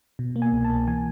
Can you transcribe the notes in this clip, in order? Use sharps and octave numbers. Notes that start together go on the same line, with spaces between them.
B2
A#3
G#5
C2
A5
A#3
E3 G#5